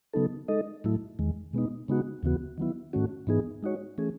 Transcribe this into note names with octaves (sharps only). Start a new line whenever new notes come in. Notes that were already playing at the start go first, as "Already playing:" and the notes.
C#3 F#3 B3 D#4 A4
G#3 D#4 A4 D#5
A2 F#3 A3 E4
E2 D#3 G#3
B2 G#3 B3 D#4
C#3 G#3 B3 D#4 F#4
D#2 C#3 E3 B3 F#4
D#3 F#3 B3 E4
G#2 D#3 A3 C#4 F#4
G#2 E3 B3 D#4 G#4
G#3 D#4 F#4 C#5
E3 A3 C#4 G#4